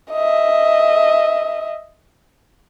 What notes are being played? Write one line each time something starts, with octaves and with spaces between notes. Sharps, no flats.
D#5 E5